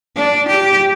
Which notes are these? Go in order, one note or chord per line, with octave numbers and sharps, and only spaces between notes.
D4
G4